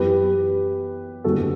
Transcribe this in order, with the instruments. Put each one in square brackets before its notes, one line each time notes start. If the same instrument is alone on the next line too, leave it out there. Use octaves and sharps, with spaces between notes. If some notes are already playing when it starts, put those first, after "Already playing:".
Already playing: [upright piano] F#2 E3 B3 G4 B4
F#1 E2 D3 G3 C4 F#4 A4